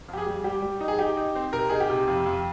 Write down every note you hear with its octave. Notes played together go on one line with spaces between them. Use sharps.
F2 G4
G#4
G3
G3 G4
G3
D#4
G#4
D#4 G4
D#4
C4
C3 A#4
D#4 G#4
G4
C3
F2
F2